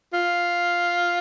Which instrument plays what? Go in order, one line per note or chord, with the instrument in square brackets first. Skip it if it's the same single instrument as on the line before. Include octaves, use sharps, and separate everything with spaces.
[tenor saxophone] F4